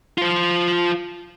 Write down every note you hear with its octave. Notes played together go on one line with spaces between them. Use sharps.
F4 C5